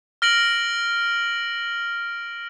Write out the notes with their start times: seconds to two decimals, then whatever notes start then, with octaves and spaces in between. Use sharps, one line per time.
0.22 F6 A#6 D7 F#7